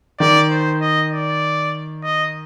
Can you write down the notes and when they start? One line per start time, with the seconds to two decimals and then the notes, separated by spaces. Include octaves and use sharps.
0.20 D#3 D5
0.50 C5
0.81 D#5
1.11 D5
2.03 D#5